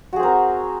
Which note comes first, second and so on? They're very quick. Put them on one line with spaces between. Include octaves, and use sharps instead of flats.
F#4 G#4 C4 A#4